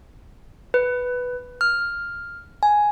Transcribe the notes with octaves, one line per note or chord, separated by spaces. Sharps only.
B4
F6
G#5